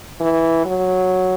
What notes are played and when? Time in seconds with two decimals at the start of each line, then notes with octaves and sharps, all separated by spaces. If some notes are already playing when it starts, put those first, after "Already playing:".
0.21 E3
0.65 F#3